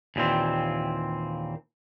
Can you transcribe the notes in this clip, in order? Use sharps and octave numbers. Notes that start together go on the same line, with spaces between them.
D#2 A#2 E3 C4